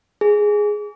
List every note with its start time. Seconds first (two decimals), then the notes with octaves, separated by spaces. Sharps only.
0.21 G#4